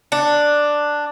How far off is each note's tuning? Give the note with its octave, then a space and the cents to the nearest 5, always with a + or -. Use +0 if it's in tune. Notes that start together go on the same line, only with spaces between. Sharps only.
D4 +5